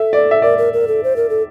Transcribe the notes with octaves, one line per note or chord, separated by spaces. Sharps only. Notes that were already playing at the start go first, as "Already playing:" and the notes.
Already playing: A4 E5
D5
E5
A#4 D5
A#4
A#4
A4
C5
A#4
A4